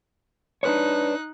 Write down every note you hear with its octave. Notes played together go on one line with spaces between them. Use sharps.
D4 D#4 B4 C#5 F#6